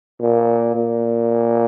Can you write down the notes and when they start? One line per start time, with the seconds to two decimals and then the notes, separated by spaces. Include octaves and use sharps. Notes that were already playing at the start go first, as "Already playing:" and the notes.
0.20 A#2
0.75 A#2